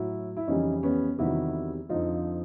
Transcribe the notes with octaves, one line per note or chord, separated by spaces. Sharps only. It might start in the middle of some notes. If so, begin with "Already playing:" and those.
Already playing: A2 F#3 E4 F#4
E4
F2 C#3 E3 G3 C#4 D#4
B3 C#4
E2 C3 D#3 G3 E4 F#4
F2 D3 F3 D#4 F4